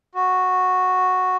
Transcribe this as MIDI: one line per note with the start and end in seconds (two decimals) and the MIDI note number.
0.15 1.37 66